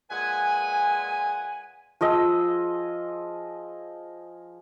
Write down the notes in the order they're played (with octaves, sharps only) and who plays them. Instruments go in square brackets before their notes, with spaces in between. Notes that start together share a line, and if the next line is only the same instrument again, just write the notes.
[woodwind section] A#2 G#3 B4 F#5 G#5
[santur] F3 G#4 D#5 E6